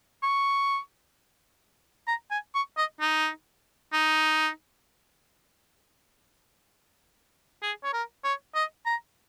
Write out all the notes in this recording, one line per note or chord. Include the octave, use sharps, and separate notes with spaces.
C#6
A#5
G#5
C#6
D#5
D#4
D#4
G#4
C#5
A#4
C#5
D#5
A#5